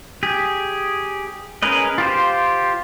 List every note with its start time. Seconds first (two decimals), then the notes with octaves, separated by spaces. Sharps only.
0.23 G4 G#4
1.62 C#4 G#4 A#4 B4 D#5
1.98 F4 G4 C5